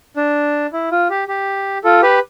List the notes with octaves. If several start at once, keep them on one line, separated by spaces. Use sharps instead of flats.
D4
E4
F4
G4
G4
F4 A4
G4 B4